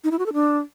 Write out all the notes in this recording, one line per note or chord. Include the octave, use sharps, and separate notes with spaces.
D#4
E4
F#4
A4
D4